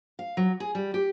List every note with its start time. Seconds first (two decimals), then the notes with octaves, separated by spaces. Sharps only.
0.19 F5
0.37 F#3
0.60 G#4
0.75 G3
0.94 G4